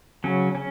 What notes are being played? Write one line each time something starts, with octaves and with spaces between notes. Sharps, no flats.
C#3 F#3 C#4
C#4